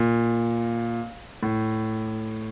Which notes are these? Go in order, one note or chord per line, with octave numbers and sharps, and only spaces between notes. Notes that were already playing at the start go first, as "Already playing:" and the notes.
Already playing: A#2
A2